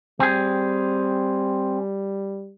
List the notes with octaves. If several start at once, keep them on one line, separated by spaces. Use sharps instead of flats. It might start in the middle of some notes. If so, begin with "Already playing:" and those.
G3 C4 G#4